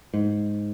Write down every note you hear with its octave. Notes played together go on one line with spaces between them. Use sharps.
G#2